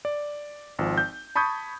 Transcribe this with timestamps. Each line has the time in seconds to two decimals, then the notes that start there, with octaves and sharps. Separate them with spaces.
0.05 D5
0.79 G#1 F3
0.98 G6
1.36 A5 B5 C#6 D#6 G6 G#6